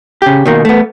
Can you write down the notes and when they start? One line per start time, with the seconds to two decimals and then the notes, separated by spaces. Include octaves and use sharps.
0.22 C#3 G4
0.45 B2 D#3 A#3
0.65 A3 B3